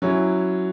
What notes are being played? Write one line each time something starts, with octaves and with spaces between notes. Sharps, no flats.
F#3 C#4 E4